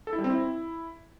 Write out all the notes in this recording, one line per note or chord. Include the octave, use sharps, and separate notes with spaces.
A4
E4
G3
C4
E4